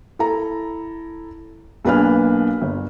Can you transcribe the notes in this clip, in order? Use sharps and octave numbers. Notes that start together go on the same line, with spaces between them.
E4 A4 A#5
B1 A#3 D4 B4 G#5 F6
G1